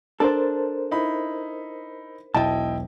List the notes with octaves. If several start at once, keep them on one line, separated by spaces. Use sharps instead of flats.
D4 A4 A#4 C5
D#4 E4 B5
E1 B1 E4 D#5 G5 A5